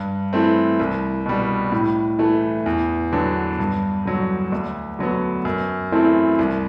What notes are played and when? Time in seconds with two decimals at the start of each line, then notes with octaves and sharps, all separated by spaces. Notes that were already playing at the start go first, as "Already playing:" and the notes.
Already playing: G2
0.33 E3 A3 C4
0.79 C2
1.26 B2 G3
1.72 A2
2.19 E3 A3
2.66 E2
3.12 D3 F#3 B3 D4
3.59 G2
4.05 D3 F#3
4.52 D2
4.99 D3 F#3 B3
5.45 F#2
5.92 E3 A3 C4 E4
6.39 C2